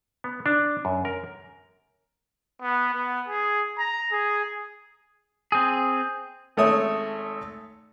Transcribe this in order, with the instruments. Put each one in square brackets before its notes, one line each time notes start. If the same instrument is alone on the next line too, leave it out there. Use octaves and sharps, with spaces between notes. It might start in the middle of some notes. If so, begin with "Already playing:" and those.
[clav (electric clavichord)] B3
D4
F#2
A#4
[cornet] B3
B3
G#4
A#5
G#4
[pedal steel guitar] C4 G#4
[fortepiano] G#1 A3 C#5 E5 D#6